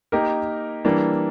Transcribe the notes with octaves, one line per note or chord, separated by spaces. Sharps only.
A#3 D#4 G4 A#4
E3 G3 A#3 D4